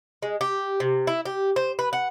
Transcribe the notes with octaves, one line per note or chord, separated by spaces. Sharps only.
G#3
G4
C3
E4
G4
C5
B4
F#5